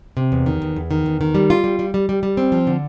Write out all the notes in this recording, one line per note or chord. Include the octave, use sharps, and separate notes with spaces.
C3
E2
D#3
E2
E2
D#3
E2
D#3
G3
F4
G3
G3
G3
G3
G3
C4
F3
D3